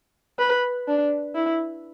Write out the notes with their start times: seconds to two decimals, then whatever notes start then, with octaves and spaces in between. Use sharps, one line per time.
0.39 B4
0.87 D4
1.35 E4